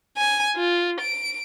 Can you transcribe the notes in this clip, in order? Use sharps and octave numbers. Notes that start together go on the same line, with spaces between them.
G#5
F4
D7